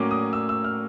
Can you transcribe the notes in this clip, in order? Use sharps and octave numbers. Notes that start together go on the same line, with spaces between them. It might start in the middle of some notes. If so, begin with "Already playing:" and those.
Already playing: A2 F#3 A#3 C#4 D6
D#6
E6
E6
F6